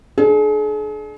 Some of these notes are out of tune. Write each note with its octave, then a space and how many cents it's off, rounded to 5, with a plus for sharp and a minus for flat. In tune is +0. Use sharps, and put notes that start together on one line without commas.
D4 +25 G#4 +40